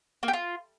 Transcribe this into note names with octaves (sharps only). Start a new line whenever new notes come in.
A#3
G4
F4